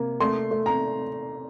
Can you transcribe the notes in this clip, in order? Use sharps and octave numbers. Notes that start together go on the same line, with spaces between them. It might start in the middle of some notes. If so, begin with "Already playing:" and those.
Already playing: C3 A#3
A3 C6
A3
A#5